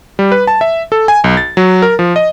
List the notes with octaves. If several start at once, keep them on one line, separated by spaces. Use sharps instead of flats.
G3
B4
A5
E5
A4
G#5
B1
A6
F#3
A#4
F3
D#5